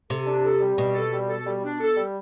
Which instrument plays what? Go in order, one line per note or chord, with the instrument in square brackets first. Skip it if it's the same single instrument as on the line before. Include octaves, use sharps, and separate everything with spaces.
[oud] C3 [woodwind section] A4
[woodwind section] D4
A4
G3
[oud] B2 [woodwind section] G3
[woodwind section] A4
G3
A4
G3
D4
A4
G3